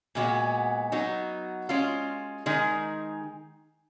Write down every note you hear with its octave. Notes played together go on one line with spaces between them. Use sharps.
A#2 G#3 B3 F#4
F#3 B3 D#4 F#4
G#3 C#4 F4
D#3 G#3 D#4 G#4